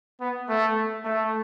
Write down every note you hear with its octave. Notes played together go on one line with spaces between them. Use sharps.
B3
A3
A3